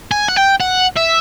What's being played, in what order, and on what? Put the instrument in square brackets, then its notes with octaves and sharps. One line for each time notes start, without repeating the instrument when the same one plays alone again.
[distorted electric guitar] G#5
F#5
G5
F#5
E5